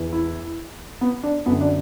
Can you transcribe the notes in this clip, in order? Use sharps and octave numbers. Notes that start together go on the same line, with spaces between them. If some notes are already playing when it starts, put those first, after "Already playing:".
Already playing: E2 E3
E4
B3
D4
F#2 D3 B3
D4